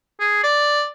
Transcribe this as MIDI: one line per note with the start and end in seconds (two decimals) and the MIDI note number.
0.20 0.39 68
0.43 0.86 74